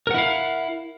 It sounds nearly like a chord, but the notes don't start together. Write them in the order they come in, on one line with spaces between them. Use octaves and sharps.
A#4 F#5 E4 F5